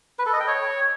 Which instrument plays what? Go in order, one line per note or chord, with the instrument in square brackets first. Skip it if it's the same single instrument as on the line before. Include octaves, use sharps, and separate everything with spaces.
[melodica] B4
A4
D#5
G5
C#5